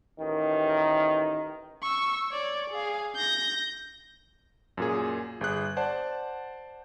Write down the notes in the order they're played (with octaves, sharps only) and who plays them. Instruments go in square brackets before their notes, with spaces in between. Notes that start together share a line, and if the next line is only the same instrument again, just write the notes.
[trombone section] A1 D#3
[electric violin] C#6 E6
C#5 D5
G#4 F5
G6 A#6
[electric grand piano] F#2 A#2 G#4
G1 G#4 F#6
C5 D5 F#5 A5